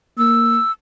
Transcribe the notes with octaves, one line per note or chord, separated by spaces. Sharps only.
A#3 E6